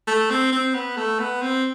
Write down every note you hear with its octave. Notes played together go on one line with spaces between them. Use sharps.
A3
C4
C4
B3
A3
B3
C4